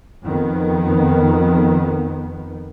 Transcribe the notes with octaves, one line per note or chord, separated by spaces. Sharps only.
F2 D#3 B3